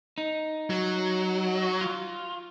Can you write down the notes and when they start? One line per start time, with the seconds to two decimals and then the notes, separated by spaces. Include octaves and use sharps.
0.18 D#4
0.70 F#3
1.81 F4